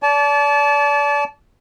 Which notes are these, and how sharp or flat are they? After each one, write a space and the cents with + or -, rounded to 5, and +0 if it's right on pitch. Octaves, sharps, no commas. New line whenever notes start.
D5 -35 A5 -25